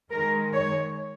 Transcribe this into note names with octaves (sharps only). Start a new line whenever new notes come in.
D#3 G#3 A#4
C#5